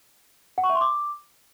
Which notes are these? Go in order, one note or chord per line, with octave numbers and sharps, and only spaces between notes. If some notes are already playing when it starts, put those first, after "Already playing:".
F#5
C#6
E5
C6
D6